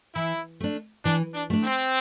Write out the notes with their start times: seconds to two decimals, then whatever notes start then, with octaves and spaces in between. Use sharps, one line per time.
0.15 E3 E4
0.60 A3 D4
1.05 E3 D4
1.34 D4
1.50 A3 D4
1.64 C4